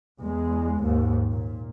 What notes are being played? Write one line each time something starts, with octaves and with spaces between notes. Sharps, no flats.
E2 G#3
D#2 G#2
A#2